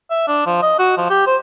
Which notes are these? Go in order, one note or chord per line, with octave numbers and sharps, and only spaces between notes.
E5
D4
F3
D#5
F#4
F3
G4
C5